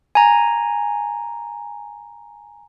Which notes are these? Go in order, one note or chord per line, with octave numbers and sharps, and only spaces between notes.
G#5 A#5